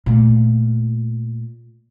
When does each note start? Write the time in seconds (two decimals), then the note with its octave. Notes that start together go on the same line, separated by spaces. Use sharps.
0.06 A#2 A3